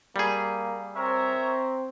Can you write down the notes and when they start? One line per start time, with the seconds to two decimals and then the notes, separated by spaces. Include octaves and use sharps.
0.16 G3 A#3 G#4
0.96 C4 A#4 C#5 E5